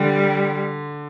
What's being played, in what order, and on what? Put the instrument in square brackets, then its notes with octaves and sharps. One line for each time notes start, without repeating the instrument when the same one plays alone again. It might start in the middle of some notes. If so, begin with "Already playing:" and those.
Already playing: [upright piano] D3 [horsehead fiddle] G3